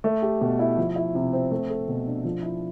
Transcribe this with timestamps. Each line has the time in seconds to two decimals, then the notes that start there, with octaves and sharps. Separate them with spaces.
0.04 A3
0.22 G4
0.41 B2
0.59 E4
0.78 F3
0.96 E4
1.15 C3
1.33 C4
1.51 A3
1.70 A4
1.88 B2
2.07 D4
2.25 F3
2.43 E4